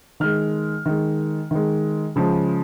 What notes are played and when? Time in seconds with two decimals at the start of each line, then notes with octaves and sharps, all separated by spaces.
0.20 D#3 G#3 F6
0.86 D#3 G#3
1.51 D#3 G#3
2.16 C#3 F3 G#3